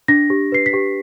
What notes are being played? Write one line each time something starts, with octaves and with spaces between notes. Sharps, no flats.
D4 A#6
G4
B4 C7
B6
G4